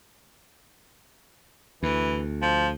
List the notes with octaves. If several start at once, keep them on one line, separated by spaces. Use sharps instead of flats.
D2 E3
F3